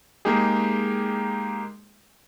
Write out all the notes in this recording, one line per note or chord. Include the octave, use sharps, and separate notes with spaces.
G#3 A#3 D#4 G4 G#4